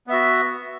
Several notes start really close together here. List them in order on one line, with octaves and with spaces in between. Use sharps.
B3 E5 F#4